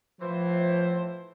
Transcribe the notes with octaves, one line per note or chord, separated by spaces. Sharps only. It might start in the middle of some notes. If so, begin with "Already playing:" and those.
A2 E3 F3 C5